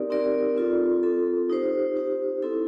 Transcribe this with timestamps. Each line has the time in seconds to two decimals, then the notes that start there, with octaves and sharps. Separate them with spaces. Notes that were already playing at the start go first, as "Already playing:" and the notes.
Already playing: C4 D#4 G4 A#4 D5
0.10 C4 D#4 G4 A#4 D5
0.56 C4 F4 A4
1.03 C4 F4 A4
1.49 D#4 G4 C5
1.96 D#4 G4 C5
2.42 C4 E4 A4